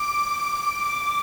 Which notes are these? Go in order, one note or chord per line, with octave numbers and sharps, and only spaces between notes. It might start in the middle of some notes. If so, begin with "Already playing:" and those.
Already playing: D6